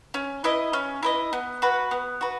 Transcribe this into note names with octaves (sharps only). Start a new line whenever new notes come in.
C#4
E4 B4 D#5
C#4
E4 B4 D#5
B3
F#4 B4
B3
F#4 B4